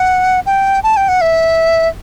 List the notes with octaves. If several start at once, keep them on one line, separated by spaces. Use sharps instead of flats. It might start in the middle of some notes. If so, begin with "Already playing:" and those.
Already playing: F#5
G5
A5
G5
F#5
E5